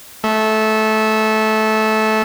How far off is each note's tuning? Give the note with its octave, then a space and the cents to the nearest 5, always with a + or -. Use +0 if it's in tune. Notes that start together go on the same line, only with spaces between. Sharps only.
A3 -15